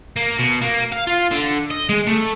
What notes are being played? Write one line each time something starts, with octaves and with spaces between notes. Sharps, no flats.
A#3
B2
A#3
F5
F4
D3
D#5
G#3
A3